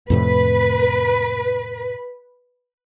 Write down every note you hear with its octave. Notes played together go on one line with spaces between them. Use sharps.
F2 A2 C3 B4